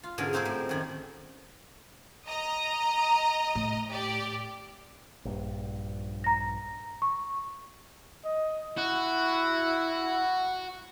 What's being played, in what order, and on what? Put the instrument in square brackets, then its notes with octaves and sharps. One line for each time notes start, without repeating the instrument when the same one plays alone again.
[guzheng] F4
G#2 B2 D3 G#3 C#4 A#4
A#3 C4 D#4 F#4 G#4 C5
A2 G3
F#2 D#3
[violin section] D#5 A#5 D#6
[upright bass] A2
[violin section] G4 D5
[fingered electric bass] A#1 G2
[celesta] A#5 A#6
C#6
[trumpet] D#5
[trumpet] E4 [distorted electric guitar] F#4